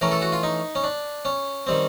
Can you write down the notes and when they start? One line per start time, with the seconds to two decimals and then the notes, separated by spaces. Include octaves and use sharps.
0.01 E3 A3 C#4 A#4
0.11 A4
0.22 F#4
0.32 F4
0.43 D#4
0.75 C#4
0.84 D4
1.25 C#4
1.67 D#3 G3 C4